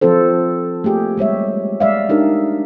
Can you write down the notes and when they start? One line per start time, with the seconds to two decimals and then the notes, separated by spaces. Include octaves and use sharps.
0.01 F3 C4 F4 A4 C5
0.84 A3 A#3 G4 G#4
1.17 G3 G#3 C#5 E5
1.80 G#3 D5 E5 F5
2.09 D4 D#4 G4 A#4